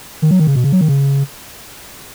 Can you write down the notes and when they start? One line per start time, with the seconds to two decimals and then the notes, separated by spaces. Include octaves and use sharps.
0.22 D#3
0.31 F#3
0.39 D#3
0.47 C#3
0.55 B2
0.64 C#3
0.72 F#3
0.81 D#3
0.88 C#3